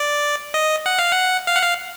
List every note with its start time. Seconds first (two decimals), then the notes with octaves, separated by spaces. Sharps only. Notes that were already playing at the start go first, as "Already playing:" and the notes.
Already playing: D5
0.54 D#5
0.86 F#5
0.99 F5
1.12 F#5
1.47 F5
1.56 F#5
1.63 F5